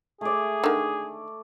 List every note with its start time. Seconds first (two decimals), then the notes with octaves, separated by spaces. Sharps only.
0.21 A3 G#4 D5
0.64 D3 D#3